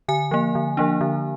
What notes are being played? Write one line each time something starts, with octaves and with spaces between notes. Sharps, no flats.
D3 G#5
F3 A#3
D3
F3 A#3 D4
D3